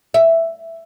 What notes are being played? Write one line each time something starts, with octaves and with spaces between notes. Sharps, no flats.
E5